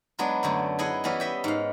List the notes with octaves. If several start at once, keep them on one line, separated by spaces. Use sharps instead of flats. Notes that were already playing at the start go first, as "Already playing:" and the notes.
F#3 G#3 B3 D4 G#4
F#2 D3 A3
E4 G#4 D#5 F#5 G#5
E3 G3 B3 C#4 E4
D#5 E5 G5
G#2 F5